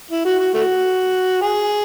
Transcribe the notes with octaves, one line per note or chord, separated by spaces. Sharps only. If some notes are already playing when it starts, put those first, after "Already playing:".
E4
F#4
F#4
A3 F#4
G#4